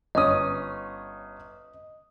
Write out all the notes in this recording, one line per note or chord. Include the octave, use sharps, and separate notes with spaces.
G1 C#4 D#5 D#6